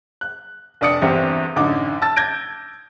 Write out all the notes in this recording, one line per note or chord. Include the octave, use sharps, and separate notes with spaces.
F#6
F1 D4 D5 D#6 C#7
G1 E2 G3 C4
A1 F#2 D3 D#4 D6
A5 E6 A6
G6 G#6 A#6 D7